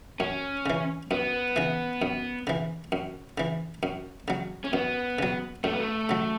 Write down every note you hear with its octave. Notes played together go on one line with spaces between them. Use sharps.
F#2 C#4
C#3 E3
F#2 B3
C#3 E3
F#2
C#3 E3
F#2
C#3 E3
F#2
C#3 F#3
C#4
F#2 B3
C#3 F#3
F#2 A3
B3
A3
C#3 F#3